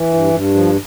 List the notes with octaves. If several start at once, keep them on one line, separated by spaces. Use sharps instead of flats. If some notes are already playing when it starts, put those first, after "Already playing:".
Already playing: E3
G2
G2
F3